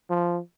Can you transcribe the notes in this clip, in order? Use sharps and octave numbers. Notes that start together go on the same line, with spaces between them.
F3